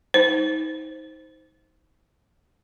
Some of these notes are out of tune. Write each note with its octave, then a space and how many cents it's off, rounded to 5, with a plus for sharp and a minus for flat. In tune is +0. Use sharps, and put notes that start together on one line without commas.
D#4 +30 C5 +0